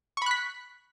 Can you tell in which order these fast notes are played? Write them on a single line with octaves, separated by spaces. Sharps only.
C#6 B5 F#6 B6